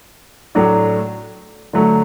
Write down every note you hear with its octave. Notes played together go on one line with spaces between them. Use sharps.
A2 F#3 A3 D4
D3 F#3 A3